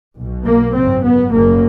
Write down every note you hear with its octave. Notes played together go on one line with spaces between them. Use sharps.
B1 B2
A#3
G#1 F#2 C#3 C4
B3
F#1 F#2 C#3 A#3